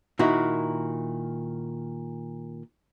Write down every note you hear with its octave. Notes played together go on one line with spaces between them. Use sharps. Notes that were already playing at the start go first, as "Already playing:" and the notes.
A#2 D#3 E4 F#4